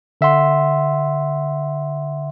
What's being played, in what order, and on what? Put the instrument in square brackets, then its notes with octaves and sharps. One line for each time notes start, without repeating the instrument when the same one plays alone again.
[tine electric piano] D3 E5 F#5 C6